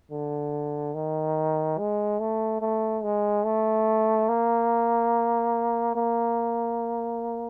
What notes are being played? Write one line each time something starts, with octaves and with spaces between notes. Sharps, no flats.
D3
D#3
G#3
A3
A3
G#3
A3
A#3
A#3